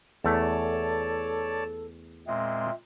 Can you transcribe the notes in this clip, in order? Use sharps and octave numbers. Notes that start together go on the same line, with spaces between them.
E2 A3 A4 C#5 D5 A5
A#2 G#3 C4 E5